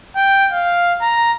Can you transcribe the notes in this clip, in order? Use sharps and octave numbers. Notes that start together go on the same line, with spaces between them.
G5
F5
A#5